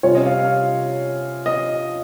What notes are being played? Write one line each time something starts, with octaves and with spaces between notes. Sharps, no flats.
C3 G3 C#4 F4 C#5
D#5
F5
F5
D#5